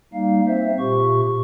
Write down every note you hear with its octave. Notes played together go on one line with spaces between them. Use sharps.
G3 A#3 D#4 F5
C4 C5 E5
A#2 G4 C#6